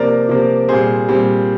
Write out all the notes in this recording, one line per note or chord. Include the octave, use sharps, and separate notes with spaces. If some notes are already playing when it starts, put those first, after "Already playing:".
Already playing: C3 F3 A#3 A#4 D5
C3 F3 A#3
A#2 G3 C4 G#4 C5
A#2 G3 C4